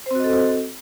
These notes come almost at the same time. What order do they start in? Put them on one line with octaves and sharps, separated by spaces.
C5 C4 F#4 D#5 A4